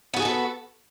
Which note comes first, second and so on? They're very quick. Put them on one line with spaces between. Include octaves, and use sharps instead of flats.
B3 F#4 G#4 B4 A4